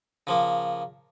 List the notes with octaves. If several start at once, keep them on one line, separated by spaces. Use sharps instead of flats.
C#3 F3 A#3